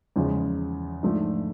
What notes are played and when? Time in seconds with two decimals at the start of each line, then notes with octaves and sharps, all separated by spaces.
0.16 E2 C#3 F3 G#3 C#4
1.03 G#2 F3 A3 D4